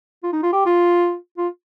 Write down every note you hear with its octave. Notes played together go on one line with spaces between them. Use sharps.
F4
D#4
F4
G4
F4
F4